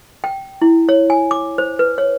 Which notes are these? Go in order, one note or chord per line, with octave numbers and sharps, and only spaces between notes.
G5
E4
C#5
G#5
D6
C5
B4
C#5